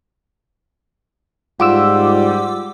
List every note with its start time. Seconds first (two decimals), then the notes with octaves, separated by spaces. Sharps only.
1.60 G#2 G3 F4 F#5 C6 D6 E6